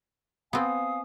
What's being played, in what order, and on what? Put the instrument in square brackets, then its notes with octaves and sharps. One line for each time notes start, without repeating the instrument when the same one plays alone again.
[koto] B3 C4 [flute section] F5 G#5 D#6